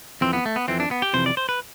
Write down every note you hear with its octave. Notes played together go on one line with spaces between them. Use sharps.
F2 E3 C4
B3
A3
B3
F2 E3 C4
D4
B3
G4
F2 C3 E3 C5
D5
C5
B4